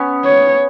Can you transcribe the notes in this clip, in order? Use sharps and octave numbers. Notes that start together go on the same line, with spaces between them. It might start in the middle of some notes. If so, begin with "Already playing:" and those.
Already playing: B3 C#4
C#5